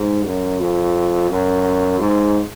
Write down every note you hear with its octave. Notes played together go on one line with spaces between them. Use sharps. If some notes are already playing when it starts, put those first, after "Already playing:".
Already playing: G#2
F#2
F2
F#2
G#2